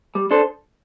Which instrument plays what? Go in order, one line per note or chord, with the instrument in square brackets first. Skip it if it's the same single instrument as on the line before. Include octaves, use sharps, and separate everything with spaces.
[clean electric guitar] G3
D4 A4 C5